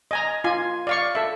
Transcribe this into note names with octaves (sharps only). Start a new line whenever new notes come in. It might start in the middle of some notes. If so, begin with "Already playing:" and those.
D#5 G#5 A#5
F4 G#5
D5 F5 C#6
A4 E5